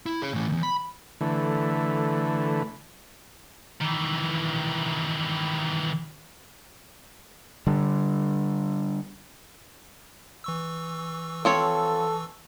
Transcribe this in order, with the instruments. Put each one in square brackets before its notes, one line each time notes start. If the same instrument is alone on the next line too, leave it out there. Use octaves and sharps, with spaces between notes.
[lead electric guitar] E4
G#4 C#5
A2 E3
E2 D#3
B5
[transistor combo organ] D3 E3 A3
[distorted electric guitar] D#3 E3
[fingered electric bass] D3 G3
[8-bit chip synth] E3 C#6 E6
[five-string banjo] F3 C4 C#5 [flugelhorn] A4